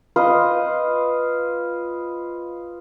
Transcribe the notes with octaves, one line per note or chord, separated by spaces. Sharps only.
F4 B4 C5 D#5